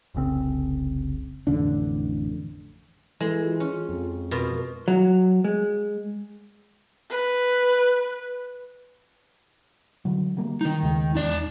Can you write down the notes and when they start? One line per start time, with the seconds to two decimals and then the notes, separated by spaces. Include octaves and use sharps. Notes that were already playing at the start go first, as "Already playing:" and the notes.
0.14 F1 C2 C#3 C4
1.47 A1 F2 D3 D4
3.20 E3 G#3 A4
3.45 F4
3.60 C#4
3.89 F2
4.31 B2 F4 A#4
4.88 F#3
5.44 G#3
7.10 B4
10.05 D3 F#3
10.37 F#3 G3 A#3
10.61 D#3 D#4
10.83 D#2 C#3 G#3
11.15 G#1 E2 D#4 D5